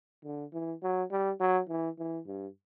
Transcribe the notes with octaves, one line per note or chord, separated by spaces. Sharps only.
D3
E3
F#3
G3
F#3
E3
E3
G2